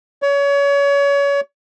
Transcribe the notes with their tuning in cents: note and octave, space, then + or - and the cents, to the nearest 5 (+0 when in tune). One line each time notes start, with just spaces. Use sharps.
C#5 +30